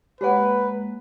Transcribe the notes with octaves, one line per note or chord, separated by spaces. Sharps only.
G#3 A#3 G4 B4 C#5 F#5